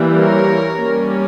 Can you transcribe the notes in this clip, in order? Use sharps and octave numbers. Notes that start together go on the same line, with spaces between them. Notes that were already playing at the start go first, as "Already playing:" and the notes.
Already playing: E3 G3 A#3
A#4 C#5
G3 A#3 C#4